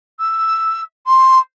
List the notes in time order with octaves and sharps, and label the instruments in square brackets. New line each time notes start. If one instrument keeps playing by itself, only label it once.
[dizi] E6
C6